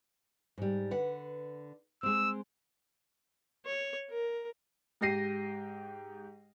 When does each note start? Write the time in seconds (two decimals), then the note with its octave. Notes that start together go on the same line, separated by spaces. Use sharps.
0.58 G#2 G3
0.91 D3 B4 F#5
2.03 G#3 C4 E6
3.66 C#5
4.10 A#4
5.01 G#2 G4 G5 A#6 C7 D#7